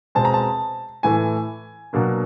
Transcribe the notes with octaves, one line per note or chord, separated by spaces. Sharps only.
B2 G#3 C4 A5
A#5
A5
A2 E3 A3 G#5
B2 F#3 A#3 D4